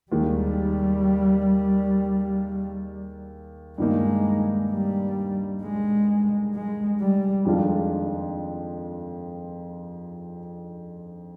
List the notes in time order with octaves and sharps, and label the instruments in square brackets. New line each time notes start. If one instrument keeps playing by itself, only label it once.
[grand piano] D#2 D#3 G#3 [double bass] G3
[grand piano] G2 D#3 A#3 D#4 [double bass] G#3
[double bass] G3
G#3
G#3
G3
[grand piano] F2 D#3 G#3 D4 F4